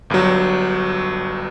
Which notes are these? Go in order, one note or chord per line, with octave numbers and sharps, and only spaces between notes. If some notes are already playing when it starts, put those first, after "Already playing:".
G1 G2 F#3